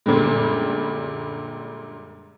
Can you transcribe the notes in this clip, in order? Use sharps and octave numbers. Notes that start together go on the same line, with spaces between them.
F#2 A#2 D3 G3 G#3